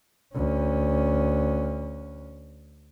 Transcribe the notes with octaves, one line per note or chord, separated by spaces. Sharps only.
D2 C#4